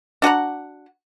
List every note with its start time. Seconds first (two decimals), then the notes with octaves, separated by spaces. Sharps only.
0.22 D4 F#4 F#5 A#5